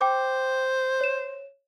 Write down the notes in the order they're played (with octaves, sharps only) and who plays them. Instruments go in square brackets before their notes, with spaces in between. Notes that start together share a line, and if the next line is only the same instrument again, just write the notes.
[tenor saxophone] C5 [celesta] G5 D6
[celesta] C#5 E7